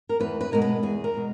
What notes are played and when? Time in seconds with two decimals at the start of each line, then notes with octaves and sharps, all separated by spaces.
0.09 A#4
0.20 E2 B4
0.41 B4
0.52 B2 G#3 A#4
0.62 B4
0.83 E2 G#4
1.04 A#4
1.14 B2 G#3